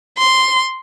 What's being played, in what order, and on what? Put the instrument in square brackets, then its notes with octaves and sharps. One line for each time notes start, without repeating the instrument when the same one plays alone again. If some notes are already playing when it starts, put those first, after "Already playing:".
[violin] C6